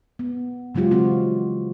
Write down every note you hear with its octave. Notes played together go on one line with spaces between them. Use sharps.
B3
C#3 F#3 G#3 F4 G4
E3 F3 C4 F#4